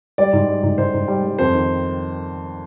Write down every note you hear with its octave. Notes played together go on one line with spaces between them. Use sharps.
G3 D5
G#2
G3
G#2
G#2 C5
G#2
G3
G3
F2 C5
D#3